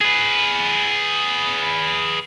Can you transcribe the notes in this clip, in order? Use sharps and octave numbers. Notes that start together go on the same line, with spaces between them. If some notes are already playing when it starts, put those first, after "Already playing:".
G#4 B4